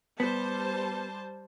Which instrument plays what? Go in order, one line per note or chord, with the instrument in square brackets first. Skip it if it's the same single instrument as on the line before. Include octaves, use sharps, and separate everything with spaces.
[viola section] G3 C5 A5 [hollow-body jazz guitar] B3